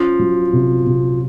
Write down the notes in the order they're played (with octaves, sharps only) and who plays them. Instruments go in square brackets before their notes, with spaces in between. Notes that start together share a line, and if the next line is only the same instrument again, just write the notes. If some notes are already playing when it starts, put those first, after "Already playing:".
Already playing: [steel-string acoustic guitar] F3 [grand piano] C#4
[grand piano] F#3
C3
C3